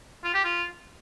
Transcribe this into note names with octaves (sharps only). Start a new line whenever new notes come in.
F4
G4
F4